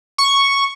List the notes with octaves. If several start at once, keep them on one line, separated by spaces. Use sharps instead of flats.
C#6